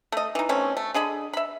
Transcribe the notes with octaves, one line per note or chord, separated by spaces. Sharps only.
A3 D#5
E3 D#4
B2 A3 C4 C#4
A3
D3 G#4 D#5 B5
E5 B5